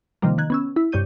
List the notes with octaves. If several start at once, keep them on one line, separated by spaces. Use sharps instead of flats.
C3 D#3 F3 G3 A#3
D#3 F#6 G#6
B3 C#4 E6
E4
G2 C3 C#5 G6 D#7